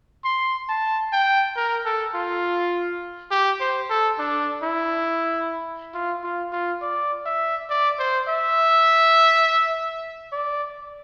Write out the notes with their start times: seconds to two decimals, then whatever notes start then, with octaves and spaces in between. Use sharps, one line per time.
0.25 C6
0.69 A5
1.13 G5
1.57 A#4
1.86 A4
2.15 F4
3.31 G4
3.61 C5
3.90 A4
4.19 D4
4.63 E4
5.94 F4
6.24 F4
6.53 F4
6.82 D5
7.26 E5
7.70 D5
7.99 C5
8.28 E5
10.32 D5